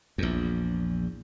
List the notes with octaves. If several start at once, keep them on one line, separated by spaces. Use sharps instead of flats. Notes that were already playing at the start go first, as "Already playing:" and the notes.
A#1 E2